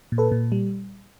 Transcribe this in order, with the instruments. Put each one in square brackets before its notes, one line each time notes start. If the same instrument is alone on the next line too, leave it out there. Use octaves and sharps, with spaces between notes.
[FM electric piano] A#2
A4 B4
A#2
G3